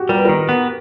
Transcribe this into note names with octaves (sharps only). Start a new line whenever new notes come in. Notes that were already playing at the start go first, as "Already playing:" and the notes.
Already playing: F#4 G4
G3 A#4
B4
D#3 A#4
B3